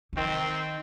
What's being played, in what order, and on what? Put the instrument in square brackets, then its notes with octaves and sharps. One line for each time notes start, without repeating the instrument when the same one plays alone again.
[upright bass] D3
[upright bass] D#3 [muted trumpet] C4